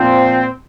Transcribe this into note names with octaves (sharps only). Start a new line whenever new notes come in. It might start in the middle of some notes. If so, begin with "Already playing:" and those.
Already playing: A#2 F3 C4